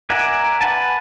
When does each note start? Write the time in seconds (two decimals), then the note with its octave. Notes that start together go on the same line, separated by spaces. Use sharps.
0.10 A#4 D5 E5 F#5 G#5
0.61 B4 F#5 G#5 A5